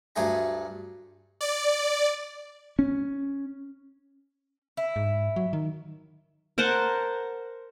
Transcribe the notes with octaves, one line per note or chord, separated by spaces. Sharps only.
D2 G2 A3 G#4 G5 A#5
D5
C#4
E4
G#2
F#3
D#3
A#4 C5 F#5 A5